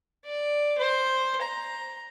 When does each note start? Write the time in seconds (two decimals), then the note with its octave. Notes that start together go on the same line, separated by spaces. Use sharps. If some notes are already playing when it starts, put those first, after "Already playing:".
0.25 D5
0.78 C5
1.42 A#5